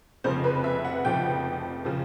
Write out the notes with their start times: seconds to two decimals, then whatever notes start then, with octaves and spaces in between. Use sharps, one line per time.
0.24 F1 F2 C#3 F3 C5
0.44 B4
0.64 E5
0.85 F#5
1.05 F1 F2 C#3 F3 G5
1.85 C#3 F3